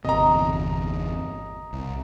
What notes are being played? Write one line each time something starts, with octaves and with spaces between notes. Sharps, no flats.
G1 E2 C3 D#5 A#5
C2